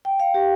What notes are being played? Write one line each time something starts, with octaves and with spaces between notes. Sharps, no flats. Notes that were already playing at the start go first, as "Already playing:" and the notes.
G5
F5
G4